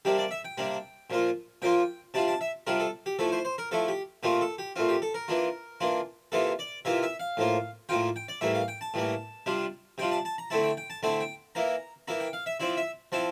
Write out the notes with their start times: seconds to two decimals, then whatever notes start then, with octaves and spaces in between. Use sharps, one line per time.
0.05 C3 G3 A#3 D4 G4
0.18 D5
0.31 E5
0.45 G5
0.57 C3 G3 A#3 D4
1.10 A#2 F3 A#3 F4
1.62 A#2 F3 A#3 F4 G5
2.14 C3 G3 D4 F4 A5
2.28 A5
2.41 E5
2.67 C3 G3 D4 F4 A#4
2.80 A4
3.06 G4
3.19 F3 A3 E4 A4
3.32 C5
3.45 C5
3.58 A#4
3.71 F3 A3 E4 A4
3.88 G4
4.23 A#2 A3 C4 F4 G4
4.41 A4
4.58 G4
4.76 A#2 A3 C4 F4
4.89 G4
5.02 A4
5.14 A#4
5.28 E3 A#3 D4 F4
5.80 E3 A#3 D4 F4
6.32 C3 E3 A#3 F4 A4
6.59 D5
6.85 C3 E3 A#3 F4 E5
7.03 E5
7.20 F5
7.37 A2 F3 A#3 F4
7.89 A2 F3 A#3 F4 G5
8.16 G5
8.28 D5
8.41 A2 E3 G3 A#3 E5
8.55 F5
8.68 G5
8.81 A5
8.94 A2 E3 G3 A#3
9.46 C3 G3 D4 F4
9.98 C3 G3 D4 F4 G5
10.12 A5
10.25 A5
10.38 A#5
10.50 D3 A3 C4 E4 A5
10.63 G5
10.77 G5
10.90 A5
11.03 D3 A3 C4 E4 A5
11.21 G5
11.55 E3 A#3 E4 A#5
12.08 E3 A#3 E4 A#5
12.20 G5
12.33 F5
12.46 E5
12.60 F3 C4 E4 D5
12.77 E5
13.12 F3 C4 E4 A5